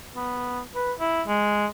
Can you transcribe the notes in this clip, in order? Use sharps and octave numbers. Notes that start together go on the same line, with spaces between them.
B3
B4
E4
G#3